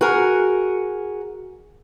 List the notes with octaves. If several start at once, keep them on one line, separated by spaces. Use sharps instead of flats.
F#4 G#4 A#4